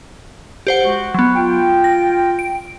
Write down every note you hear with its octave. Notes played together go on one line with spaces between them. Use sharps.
G4 C5 F#5
G#3 F#4
F#3 B3
F4 G5
A#6
D7